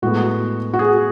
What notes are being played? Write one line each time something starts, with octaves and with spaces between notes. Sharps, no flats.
A2 G#3 B3 F#4
F#4
G#4